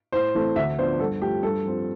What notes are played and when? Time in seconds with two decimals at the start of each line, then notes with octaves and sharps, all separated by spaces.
0.12 A2 C5
0.35 E3 A3 C4
0.56 D2 E5
0.78 D3 F3 B3 D4 C5
0.99 G2 A4
1.21 F3 A3 G4
1.43 G2 A4
1.65 F3 C4